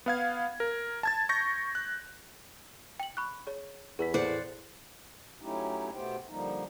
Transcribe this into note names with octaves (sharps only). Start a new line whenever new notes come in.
B3 F5 G#6
A#4
A5 G#6 A6
C#6 G6 A#6
F#6
G5 F#7
B5 C#6 F#6
G#4 C#5
E2 G#4 B4 B6
A2 C5 D5 F#5
F#3 A3 C#4 D#4 E4 G4
B2 A3 B3 G4 C5 G5
D3 F3 G3 A#3 D#4